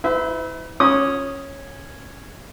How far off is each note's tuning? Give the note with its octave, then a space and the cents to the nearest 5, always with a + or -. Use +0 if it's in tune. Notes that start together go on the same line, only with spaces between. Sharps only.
E4 -35 B4 +45 E5 -20
C#4 -10 D#6 +0